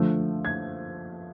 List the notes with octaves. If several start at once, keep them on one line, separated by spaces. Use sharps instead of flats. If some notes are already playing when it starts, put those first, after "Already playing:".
Already playing: D3 F3 A3
G#6